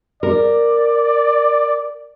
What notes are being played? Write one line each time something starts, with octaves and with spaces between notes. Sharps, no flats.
A#4 D5